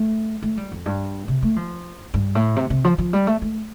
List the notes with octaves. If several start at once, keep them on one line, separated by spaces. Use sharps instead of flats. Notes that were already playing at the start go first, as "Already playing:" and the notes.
Already playing: A3
A3
G3
F2
G2
C3
A3
F3
G2
A2
C3
C3
F3
F3
G3
A3
A3